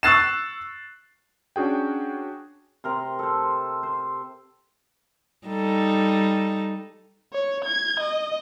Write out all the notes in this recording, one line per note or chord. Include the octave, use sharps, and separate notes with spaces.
C#6 E6 F#6 A6 C7 E7
C#4 D4 F#4 G#4 G5
C3 A#4 C6
A4 C5
C5
G3 D#4 A4
C#5
G#6
D#5